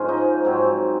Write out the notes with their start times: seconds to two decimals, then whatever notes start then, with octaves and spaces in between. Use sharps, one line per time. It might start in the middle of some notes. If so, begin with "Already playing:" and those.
Already playing: G#2 F3 G#3 C#4
0.09 D#4
0.45 G#2 F#3 C4